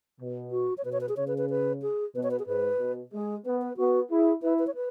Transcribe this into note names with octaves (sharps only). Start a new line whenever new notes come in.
B2
F#4
C#5
B2 B4
C#5
B4
G#4
C#3 C#5
B4
B4
B4
G#4
B2 B4
C#5
B4
G#4
G#2 B4
B2
G#3 G#4
B3 B4
B4
B3 F#4
E4 G#4
E4 B4
B4
C#5
B4